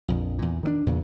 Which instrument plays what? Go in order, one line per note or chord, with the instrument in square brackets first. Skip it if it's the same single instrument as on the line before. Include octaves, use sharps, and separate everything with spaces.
[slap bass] A#1 F2
E2 A#2
D#3 F#3 D4
E2 A#2 C#3